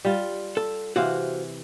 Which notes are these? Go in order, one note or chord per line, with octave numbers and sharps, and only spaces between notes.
G3 F4
A4
C3 E3 F#4 C5 F5